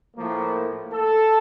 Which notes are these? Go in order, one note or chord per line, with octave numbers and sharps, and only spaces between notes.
A2 F3 A#3
A4